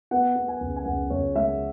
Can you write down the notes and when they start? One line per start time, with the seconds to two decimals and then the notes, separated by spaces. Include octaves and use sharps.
0.11 B3 F#5
0.36 B3
0.48 G#5
0.61 C#2
0.76 G#5
0.85 C#2 F#5
1.10 C#2 C#5
1.35 G#3 E5